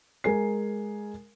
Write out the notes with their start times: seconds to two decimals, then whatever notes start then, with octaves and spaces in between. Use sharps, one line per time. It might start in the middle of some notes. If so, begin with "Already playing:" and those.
0.24 G#3 A#4 G#5 C7